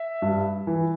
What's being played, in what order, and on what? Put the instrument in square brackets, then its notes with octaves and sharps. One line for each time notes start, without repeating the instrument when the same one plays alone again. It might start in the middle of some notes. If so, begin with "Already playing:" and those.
Already playing: [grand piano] E5
G2
E3